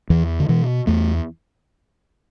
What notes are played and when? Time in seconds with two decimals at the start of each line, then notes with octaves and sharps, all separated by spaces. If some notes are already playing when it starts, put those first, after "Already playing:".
0.10 E2 E3
0.40 D3
0.49 B2 E3
0.87 E2 A3